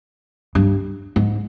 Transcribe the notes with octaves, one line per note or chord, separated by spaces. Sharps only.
G2
G#2